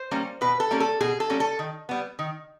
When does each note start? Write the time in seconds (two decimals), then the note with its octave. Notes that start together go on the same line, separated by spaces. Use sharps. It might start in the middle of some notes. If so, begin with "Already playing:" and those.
Already playing: C5
0.11 G3 A#3 C#4
0.41 B2 B4
0.60 A4
0.71 G3 A#3 C#4
0.80 A4
1.01 B2 G#4
1.20 A4
1.30 G3 A#3 C#4
1.40 A4
1.59 D#3
1.89 G3 B3
2.19 D#3